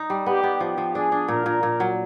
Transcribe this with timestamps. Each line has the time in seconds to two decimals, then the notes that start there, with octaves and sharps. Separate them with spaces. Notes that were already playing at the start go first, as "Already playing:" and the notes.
Already playing: D#4
0.10 G3
0.26 B3 G4
0.43 B3
0.60 F3 G4
0.78 F3
0.95 D4 G#4
1.12 D4
1.28 A#2 A#4
1.46 A#2
1.63 A#2
1.80 F#3